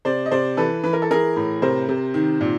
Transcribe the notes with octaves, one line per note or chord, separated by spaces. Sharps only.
C3 C5 D5
D#5
C3 C5 D5
E3 A4 B4
E3 B4
A#4
A4
E3 G#4 A#4
A2
C3 A#4 C5
C3
D#3
A#2